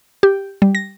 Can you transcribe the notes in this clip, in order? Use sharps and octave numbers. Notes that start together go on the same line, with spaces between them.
G4
G3
A#6